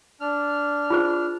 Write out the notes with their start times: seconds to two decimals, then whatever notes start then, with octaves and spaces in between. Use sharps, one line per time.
0.21 D4 F6
0.90 F4 G#4 C5